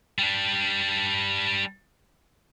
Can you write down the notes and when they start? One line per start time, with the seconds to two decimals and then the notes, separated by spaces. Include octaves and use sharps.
0.19 G3 D4